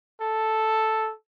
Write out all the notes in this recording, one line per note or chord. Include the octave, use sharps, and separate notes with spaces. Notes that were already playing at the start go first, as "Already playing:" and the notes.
A4